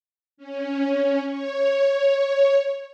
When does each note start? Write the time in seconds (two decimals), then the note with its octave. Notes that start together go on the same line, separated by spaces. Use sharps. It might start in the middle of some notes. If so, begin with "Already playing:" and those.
0.37 C#4
1.27 C#5